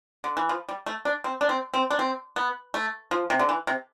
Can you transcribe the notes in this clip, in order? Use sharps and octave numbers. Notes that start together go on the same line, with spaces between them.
D3
E3
F3
G3
A3
D4
C4
D4
C4
C4
D4
C4
B3
A3
F3
C3
D3
E3
C3